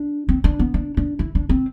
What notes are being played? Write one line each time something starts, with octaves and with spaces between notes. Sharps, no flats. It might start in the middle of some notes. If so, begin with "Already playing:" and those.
Already playing: D4
C4
D4
B3
D4
D4
E4
D4
C4